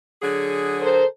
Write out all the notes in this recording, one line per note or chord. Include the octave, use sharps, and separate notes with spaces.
D3 F#3 G#4
A4 A#4 C5